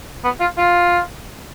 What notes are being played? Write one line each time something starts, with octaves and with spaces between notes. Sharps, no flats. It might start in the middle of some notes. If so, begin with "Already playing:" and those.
B3
F4
F4